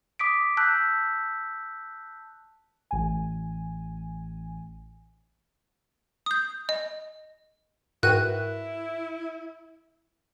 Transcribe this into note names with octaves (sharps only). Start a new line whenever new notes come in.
D6 D#6 B6 D7
A5 E6 F#6 G6 B6
A1 G#5
D#6 G6
D#5
G#2 E4 F#4 A#4 B4 G5 F#6 D#7